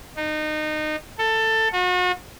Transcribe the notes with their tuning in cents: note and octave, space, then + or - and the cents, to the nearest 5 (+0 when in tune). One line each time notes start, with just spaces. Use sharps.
D#4 -25
A4 +15
F#4 -40